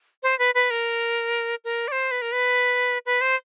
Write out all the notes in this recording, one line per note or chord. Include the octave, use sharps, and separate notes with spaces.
C5
B4
B4
A#4
A#4
D5
C5
B4
A#4
B4
B4
C5